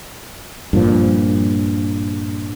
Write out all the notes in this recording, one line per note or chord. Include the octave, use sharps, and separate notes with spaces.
G2 A#2 F3